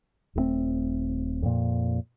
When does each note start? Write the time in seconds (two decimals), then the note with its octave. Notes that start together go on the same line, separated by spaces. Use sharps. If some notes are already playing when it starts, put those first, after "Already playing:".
0.36 D#1 G2 A3 C4
1.42 F2 A#2